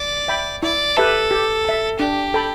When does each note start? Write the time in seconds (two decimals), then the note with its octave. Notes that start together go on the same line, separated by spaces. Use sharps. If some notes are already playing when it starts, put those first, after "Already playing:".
Already playing: D5
0.28 E5 G5 B5
0.63 E4 D5
0.96 G4 A4 B4 E5 A5
1.31 G4
1.65 E5 A5
1.99 D4 G4
2.34 A4 G5 B5